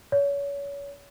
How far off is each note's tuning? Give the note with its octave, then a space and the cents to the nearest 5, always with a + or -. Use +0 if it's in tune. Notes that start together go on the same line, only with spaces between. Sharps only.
C#5 +30